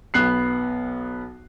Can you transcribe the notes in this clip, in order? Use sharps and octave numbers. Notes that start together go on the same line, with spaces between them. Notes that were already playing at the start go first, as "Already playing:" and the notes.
B1 B3 F#6 C7